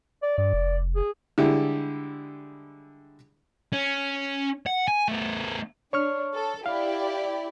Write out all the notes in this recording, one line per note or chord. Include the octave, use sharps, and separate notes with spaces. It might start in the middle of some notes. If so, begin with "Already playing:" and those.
D5
G2 D5
F1
G#4
D3 G3 G#3 E4 G4
C#4
F#5
G#5
A3 B3
D4 C#5 C#6 F6
A4
E4 G4 D5 F5